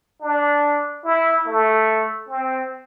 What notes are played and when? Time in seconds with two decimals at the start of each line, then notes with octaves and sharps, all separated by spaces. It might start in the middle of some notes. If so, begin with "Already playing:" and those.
0.22 D4
1.04 E4
1.46 A3
2.29 C4